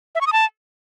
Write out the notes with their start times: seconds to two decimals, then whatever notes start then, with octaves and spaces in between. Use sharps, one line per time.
0.15 E5
0.21 C#6
0.27 D#6
0.33 A5